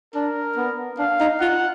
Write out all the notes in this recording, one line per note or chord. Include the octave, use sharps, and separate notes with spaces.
D4 A#4
B3
D4 F5
D#4
F4 F#5